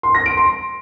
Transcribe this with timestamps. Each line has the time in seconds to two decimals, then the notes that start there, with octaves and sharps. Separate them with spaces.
0.03 C6
0.15 A#6
0.26 D7
0.37 C6